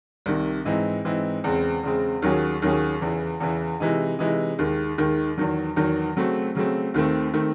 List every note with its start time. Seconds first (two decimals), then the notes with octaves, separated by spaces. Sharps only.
0.26 C2 C3 D#3
0.65 G#2 E3 C4 D#4
1.05 G#2 E3 C4 D#4
1.44 E2 C#3 G#3 C4
1.83 E2 C#3 G#3 C4
2.22 D#2 D#3 F#3 C#4 G#4
2.62 D#2 D#3 F#3 C#4 G#4
3.01 E2 C#3 E3
3.40 E2 C#3 E3
3.80 C3 E3 G#3 D#4
4.19 C3 E3 G#3 D#4
4.59 D#2 D#3 G#3
4.98 D#2 D#3 G#3
5.38 E2 D#3 F#3
5.76 E2 D#3 F#3
6.16 C#3 F#3 A3 C4
6.55 C#3 F#3 A3 C4
6.94 D#2 D#3 A3 C4
7.34 D#3 A3 C4